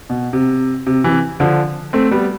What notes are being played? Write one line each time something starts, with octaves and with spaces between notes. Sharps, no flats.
B2
C3
C3
C3 E3
D3 F3
A3 C4
G3 B3